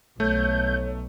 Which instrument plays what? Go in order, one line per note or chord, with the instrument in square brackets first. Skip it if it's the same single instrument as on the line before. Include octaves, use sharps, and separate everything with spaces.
[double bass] B1 [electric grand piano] A3 [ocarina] C#5 [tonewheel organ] G6